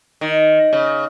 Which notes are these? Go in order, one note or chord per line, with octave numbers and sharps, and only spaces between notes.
D#3
C#3